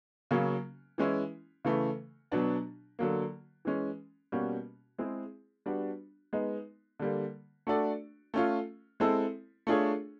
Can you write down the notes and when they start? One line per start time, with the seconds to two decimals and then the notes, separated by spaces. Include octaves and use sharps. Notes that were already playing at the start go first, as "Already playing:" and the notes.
0.31 C#3 F#3 A#3 C#4
0.98 E3 G#3 C#4 E4
1.65 C#3 E3 A3
2.32 B2 F#3 B3 D4
2.99 D3 F#3 A#3
3.65 E3 G#3 C#4
4.32 B2 G3 A#3 C#4 F#4
4.98 G#3 C4 E4 G#4
5.66 G3 B3 D4 F#4
6.33 G#3 B3 D#4
6.99 D3 G3 A#3
7.67 A3 D4 F#4 A4 D5
8.34 A3 C#4 F4
9.00 G#3 C4 E4 A4
9.67 A3 D4 F4 G#4 C#5